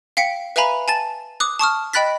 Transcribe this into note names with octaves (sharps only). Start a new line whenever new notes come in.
F5 G5 B6 C#7
B4 E5 F5 G#5 A#5 B5
G#5 A5 A6
D6 D#6 F#6
A5 C#6 D#6 F6
D#5 G5 B5 F#6 A6 B6